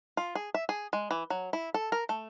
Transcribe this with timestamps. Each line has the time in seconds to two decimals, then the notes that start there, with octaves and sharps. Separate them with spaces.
0.17 F4
0.35 G#4
0.54 E5
0.69 G#4
0.93 G#3
1.11 E3
1.30 F#3
1.53 E4
1.74 A4
1.92 A#4
2.09 A3